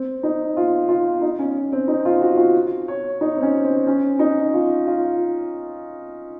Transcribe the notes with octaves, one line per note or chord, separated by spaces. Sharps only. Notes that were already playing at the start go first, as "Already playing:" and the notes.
Already playing: C4
D#4
F4
F4
D#4
C#4
C4
D#4
F4
F#4
F4
C#5
D#4
C4
C#4
C4
C#4
D#4
F4
F4